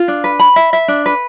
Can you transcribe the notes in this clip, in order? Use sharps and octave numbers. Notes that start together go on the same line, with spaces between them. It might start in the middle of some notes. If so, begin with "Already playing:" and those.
Already playing: F4
D4
B4
B5
E5
E5
D4
B4